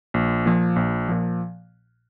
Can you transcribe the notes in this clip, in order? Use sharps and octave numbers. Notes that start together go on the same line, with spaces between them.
A#1
A#2 F3
A#1
A#2 F3